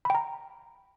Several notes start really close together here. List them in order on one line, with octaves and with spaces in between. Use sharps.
B5 G5 A#5